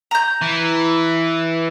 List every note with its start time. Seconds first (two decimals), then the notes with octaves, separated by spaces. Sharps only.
0.11 A#5 G6
0.42 E3